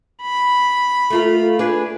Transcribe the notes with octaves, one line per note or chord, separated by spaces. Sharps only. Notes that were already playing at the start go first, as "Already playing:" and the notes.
B5
A3 F4 A#4
D4 G#4 B4